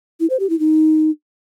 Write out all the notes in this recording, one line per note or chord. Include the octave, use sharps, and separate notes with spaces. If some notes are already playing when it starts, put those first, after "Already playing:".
E4
C5
G4
E4
D#4